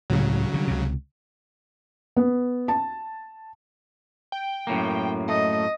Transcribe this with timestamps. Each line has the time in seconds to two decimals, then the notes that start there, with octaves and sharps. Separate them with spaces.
0.10 C#2 A2 C#3 F#3
0.54 D3 G3
0.68 C#2 C3
2.17 B3
2.68 A5
4.32 G5
4.67 F#2 A2 A#3
5.28 A3 D#5